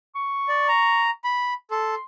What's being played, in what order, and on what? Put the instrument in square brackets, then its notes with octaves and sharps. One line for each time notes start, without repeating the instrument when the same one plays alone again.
[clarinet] C#6
[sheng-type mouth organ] D5
A#5
B5
[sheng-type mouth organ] A4 [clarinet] C6